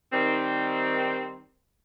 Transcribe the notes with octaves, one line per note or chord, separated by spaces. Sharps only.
D#3 G3 C4